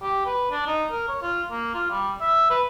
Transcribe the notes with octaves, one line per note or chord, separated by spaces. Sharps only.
G4
B4
D4
D#4
A#4
C#5
F4
A#3
F4
G3
E5
B4